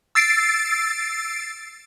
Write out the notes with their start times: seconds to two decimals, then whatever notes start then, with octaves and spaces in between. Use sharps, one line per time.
0.15 E6 A6 C7 D7